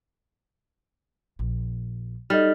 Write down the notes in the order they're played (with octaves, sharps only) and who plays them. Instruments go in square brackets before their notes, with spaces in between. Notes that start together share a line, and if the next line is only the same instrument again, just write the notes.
[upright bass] A#1
[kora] G3 [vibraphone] D#4 A4 [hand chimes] D#5 F6